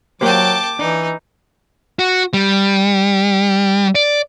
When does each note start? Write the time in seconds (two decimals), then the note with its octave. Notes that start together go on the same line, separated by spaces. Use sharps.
0.21 F#3 A#3 G4 C5 G5 A5 D6
0.79 E3 D4 D#4
1.99 F#4
2.33 G3
3.95 D5